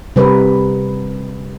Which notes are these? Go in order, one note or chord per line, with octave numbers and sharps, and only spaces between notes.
C3 G3 A#4 B4